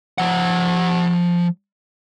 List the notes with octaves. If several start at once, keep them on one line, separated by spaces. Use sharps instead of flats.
F3 F#5